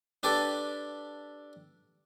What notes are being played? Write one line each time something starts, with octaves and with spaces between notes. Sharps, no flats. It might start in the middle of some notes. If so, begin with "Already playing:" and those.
D4 G4 A4 B4 D5